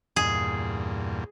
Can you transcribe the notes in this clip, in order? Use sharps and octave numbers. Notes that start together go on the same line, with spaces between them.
E2 G2 A#2 G#4